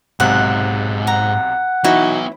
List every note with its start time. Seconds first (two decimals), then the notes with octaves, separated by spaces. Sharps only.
0.20 B1 G#2 C3 F#5 F#6
1.07 F#5 A#5
1.84 E3 B3 D#4 E4 F#4 C#5